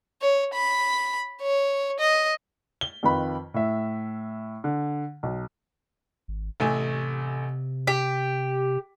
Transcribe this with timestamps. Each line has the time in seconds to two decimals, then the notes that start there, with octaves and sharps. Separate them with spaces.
0.21 C#5
0.53 B5
1.41 C#5
1.99 D#5
2.81 G7
3.03 F2 D#3 F4 B4 B5
3.54 A2 E5
4.64 D3
5.23 B1
6.28 G#1
6.60 A1 C3 A3 G#5
7.87 G4 B6